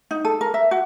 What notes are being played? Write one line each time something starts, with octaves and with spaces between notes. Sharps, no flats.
D#4
A4
A#4
E5
F#4